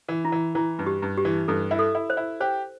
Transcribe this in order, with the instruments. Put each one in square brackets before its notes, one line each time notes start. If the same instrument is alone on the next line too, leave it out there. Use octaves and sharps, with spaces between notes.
[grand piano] E3
[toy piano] E4
[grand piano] E3
[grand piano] E3 [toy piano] E4
[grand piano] G2
[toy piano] G4
[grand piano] G2
[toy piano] G4
[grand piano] E3
[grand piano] G2 [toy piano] A4
[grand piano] E4
[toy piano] A4
[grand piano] E4
[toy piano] C5
[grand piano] E4
[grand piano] G4 [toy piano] C5